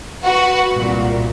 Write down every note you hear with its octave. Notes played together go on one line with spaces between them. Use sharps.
F#4 B4
C2 A#2